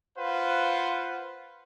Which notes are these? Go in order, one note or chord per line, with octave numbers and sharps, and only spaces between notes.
F4 B4 C5 F5 F#5